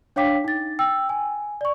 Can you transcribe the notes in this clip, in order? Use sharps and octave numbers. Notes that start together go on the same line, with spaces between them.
D4 C#5 F5 G5 D6 B6
D#4 A6
G5 E6
G#5
D5 C#6